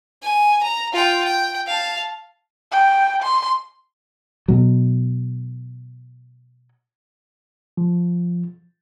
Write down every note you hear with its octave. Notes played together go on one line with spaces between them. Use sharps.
G#5
A#5
F4 G5
G5
F5 A5
G5
C6
B2 F#3
F3